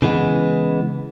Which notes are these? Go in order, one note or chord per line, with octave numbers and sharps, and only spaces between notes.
C#3 E3 G#3 B3